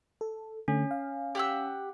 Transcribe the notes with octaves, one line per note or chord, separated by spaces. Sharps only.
A4
D3 A3 C#4
F5
G4 F#5 E6